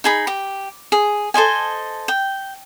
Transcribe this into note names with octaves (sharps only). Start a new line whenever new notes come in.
D#4 G#4 B5
G4
G#4
A4 C5 D#5 G#5
G5